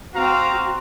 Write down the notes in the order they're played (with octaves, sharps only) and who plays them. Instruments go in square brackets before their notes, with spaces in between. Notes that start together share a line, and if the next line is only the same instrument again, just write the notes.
[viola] C4 F#4 [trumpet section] F5 A#5